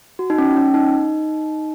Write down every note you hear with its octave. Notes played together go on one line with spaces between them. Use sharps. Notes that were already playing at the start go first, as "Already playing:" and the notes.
F#4
D#4
C#4
C#4
D#4